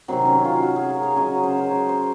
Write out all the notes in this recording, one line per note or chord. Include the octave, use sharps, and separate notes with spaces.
C3 D#3 F#3 C4
C#4
F4
F#4
G#4
A#4
C#5
C#3 F#3 D#5
C5
A#4
C5
C5